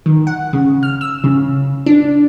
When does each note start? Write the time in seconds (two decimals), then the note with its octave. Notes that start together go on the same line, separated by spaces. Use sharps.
0.06 D#3
0.27 F#5
0.53 C#3
0.83 F6
1.01 E6
1.24 C#3
1.86 D4